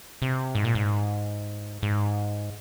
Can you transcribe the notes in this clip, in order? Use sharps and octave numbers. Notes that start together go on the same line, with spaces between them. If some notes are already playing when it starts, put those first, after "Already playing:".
C3
G#2
A#2
G#2
G#2